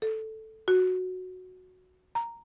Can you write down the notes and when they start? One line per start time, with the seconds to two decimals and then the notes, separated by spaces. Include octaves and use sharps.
0.02 A4
0.68 F#4
2.15 A#5